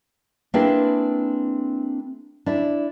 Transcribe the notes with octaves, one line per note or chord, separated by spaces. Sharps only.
A#3 C4 D4 E4 G#4 B4
D4 E4